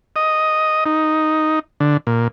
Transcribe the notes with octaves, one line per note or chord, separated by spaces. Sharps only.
D#5
D#4
D3
A#2